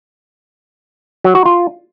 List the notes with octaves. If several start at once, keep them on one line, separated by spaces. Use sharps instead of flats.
F#3
F#4
F4